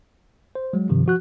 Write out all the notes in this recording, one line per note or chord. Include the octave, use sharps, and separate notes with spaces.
C5
F#3 G#3
G2 C3 D#3 F3
F3 F#4 F#6